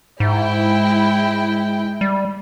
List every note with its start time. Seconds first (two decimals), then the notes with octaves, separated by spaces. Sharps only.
0.20 G#2 G#3 E4 G5
2.01 G3